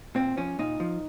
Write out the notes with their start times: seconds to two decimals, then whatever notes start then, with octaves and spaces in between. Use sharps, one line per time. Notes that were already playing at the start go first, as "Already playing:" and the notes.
0.15 A#2 C4
0.37 F3 C#4
0.59 A#2 D#4
0.80 F3